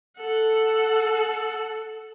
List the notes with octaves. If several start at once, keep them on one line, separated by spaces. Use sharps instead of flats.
A4 F#5